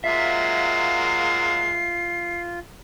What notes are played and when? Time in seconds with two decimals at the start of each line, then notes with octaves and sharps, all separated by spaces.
0.04 F#3 G#3 A#3 F4 E5 C7